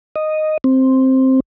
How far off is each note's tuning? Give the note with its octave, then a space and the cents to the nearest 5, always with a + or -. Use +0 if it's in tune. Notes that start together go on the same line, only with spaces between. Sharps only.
D#5 -5
C4 +5